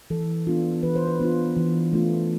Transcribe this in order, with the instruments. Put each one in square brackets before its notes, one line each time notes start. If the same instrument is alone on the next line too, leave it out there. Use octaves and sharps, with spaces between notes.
[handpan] E3 A4
B3 D4 F4
E3 B4
C5
B4
B3 D4 F4
E3
A3 D4 F4